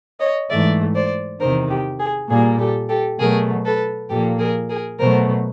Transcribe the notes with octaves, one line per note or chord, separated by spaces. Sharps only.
C#5 D#5
G#2 E3 A3 D5 E5
C5 D5
E2 C3 D#3 A#4 C5
G4
G#4
A#2 G3 A#3 G#4
G4 A4
G4 A4
B2 F#3 A3 G#4 A#4
A4 B4
A#2 F3 A#3 G4 A4
G#4 A#4
G#4 A#4
B2 F#3 A3 A#4 C5